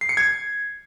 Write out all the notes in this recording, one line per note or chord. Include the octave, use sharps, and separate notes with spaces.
C7
C#7
G#6